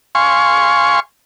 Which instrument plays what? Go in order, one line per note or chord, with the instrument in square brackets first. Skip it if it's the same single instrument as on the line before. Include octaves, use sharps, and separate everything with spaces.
[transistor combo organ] F5 G#5 C6 C#6